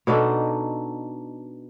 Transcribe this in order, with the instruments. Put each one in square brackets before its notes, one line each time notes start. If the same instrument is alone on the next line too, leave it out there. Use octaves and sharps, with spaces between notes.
[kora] B2 D4 D#4 A4